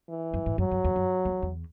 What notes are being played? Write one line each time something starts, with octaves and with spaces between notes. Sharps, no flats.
E3
F#2
G#2
F#2 F#3
F#2
E2
F#2
E2
E2